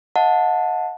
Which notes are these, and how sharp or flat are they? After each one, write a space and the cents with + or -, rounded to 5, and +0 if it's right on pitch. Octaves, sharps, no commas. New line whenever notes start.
D#5 +30 F#5 -30 A5 +0